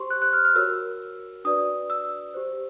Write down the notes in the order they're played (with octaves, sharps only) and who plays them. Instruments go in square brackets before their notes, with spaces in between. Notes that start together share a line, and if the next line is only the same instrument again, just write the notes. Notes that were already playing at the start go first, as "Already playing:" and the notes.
Already playing: [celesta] G4 C5 C6 C#6
F#6
F#6
F6
F6
F#4 A#4 C#5 E6
D4 F#4 B4 D5 D#6
E6
G4 C5